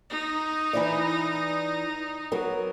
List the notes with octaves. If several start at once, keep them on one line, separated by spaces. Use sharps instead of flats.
D#4
E3 E4 D5
F#3 B3 A#4